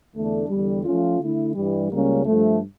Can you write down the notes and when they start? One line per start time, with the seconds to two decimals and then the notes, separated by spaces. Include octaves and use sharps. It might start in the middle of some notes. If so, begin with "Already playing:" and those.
0.14 E2 D3 A3 D4
0.49 E2 D3 G3
0.85 F3 A3 C#4 F4
1.19 D3 A3 E4
1.55 G2 E3 G3
1.91 C#2 C#3 G3 A#3 C#4
2.26 G2 F3 A3